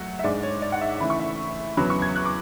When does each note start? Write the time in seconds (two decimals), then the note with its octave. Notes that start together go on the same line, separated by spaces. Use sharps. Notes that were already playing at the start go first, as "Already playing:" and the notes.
Already playing: F#3 A3 F#5
0.19 E5
0.24 G#2 G#3 D4 D5
0.43 C#5
0.62 D5
0.72 F#5
0.81 E5
1.00 C#3 E3 A3 E4 B5
1.10 C#6
1.19 E5
1.77 E2 C#3 F#3 B3 B5
1.90 C#6
2.02 G#6
2.16 F#6
2.25 D6